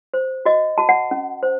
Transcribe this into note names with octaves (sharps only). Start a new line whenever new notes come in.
C5
F#4 D#5
F#4 A5
F#5
C#4
C5